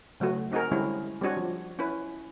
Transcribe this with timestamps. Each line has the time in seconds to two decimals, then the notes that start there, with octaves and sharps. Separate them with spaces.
0.20 C#3 F#3 A3 F#4
0.52 C4 D#4 F#4 G#4 A#4
0.71 D3 G3 G#3 C4 C#4 E4
1.21 G3 C4 D4 F#4 C#5
1.37 F3
1.79 C#4 E4 B4